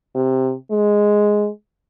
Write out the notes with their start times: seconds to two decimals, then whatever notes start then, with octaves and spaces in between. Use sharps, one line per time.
0.15 C3
0.71 G#3